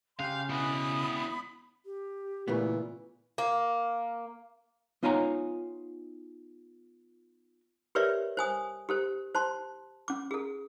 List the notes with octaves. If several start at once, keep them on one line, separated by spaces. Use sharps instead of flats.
C#3 G4 G#4 F5 C6 F#6 G6
B2 E3 B5 D#6
G4
A#2 C#3 E3 A3 B3
A#3
B3 D#4 F4 C#5 G#5 A#5
G4 A#4 B4 C#5 D5 E5
C5 G#5 D#6
G4 A4 C5
C5 A5 C6
C#4 D6
G#4 A4